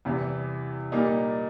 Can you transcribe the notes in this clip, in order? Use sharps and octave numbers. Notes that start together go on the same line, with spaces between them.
E2 C3 E3 G3
A#2 G3 A#3 D#4